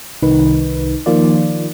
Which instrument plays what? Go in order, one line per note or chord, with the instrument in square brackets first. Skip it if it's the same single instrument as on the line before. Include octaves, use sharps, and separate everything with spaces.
[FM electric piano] C2 D#3 D#4 B4
D#3 F3 A#3 F4 D5